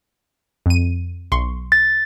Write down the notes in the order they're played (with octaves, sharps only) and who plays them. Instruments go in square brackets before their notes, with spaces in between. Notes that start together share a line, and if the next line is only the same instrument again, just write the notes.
[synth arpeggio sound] F2 D#7
B1 C6 C#6
[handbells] A6